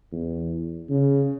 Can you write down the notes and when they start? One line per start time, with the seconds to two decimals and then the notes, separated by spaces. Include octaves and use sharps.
0.12 E2
0.89 C#3